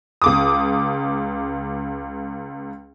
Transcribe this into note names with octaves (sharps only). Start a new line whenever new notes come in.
C#2 D6 D#6